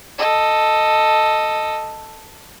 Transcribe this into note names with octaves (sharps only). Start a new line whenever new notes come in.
A4 D#5